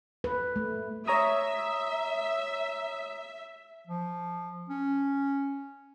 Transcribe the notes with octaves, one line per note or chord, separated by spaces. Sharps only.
B4
A3
C#5 E5 A#5 D#6
F3
C#4